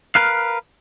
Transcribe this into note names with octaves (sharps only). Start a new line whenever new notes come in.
A#4 B4 F5